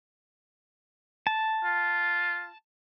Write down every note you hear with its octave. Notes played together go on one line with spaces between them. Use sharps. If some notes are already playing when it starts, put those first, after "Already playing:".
A5
F4